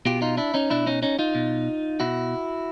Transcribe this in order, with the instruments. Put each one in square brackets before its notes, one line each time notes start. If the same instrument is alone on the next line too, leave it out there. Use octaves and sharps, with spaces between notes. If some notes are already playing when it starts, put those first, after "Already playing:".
[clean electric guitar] B2 F4 G4
D#4 F4
D4 E4
C#4 D#4
B2 D4 E4
C#4 D#4
C#4 D#4
D#4 F4
B2
B2 E4 F#4